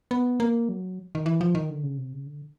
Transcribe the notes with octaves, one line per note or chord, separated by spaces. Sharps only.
B3
A#3
F#3
D#3
E3
F3
D#3
D3
C#3
C3
C#3
D3